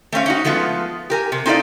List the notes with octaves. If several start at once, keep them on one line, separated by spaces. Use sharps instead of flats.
A3 C4 C#4 F5
C#4 D#4 F#4
F3 G#3 A3 B3 F4
G4 A#4 G#5
C3
C4 D#4 E4 A4 D5 F5